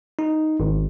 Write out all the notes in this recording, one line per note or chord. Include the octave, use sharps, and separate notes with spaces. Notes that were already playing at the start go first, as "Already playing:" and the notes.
D#4
G#1